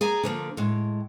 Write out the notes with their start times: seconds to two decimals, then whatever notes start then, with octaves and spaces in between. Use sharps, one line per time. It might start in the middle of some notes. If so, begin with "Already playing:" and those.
0.01 G#4 D5 G#5 A#5
0.23 D3 F3 A#3
0.57 A2 G#3